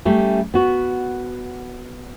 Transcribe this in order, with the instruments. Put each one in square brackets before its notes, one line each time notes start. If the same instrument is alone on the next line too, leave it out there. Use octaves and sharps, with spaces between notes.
[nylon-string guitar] G3 A3 C#4
B3 F#4